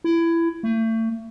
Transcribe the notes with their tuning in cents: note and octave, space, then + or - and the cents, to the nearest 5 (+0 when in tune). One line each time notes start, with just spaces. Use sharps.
E4 +20
A3 +35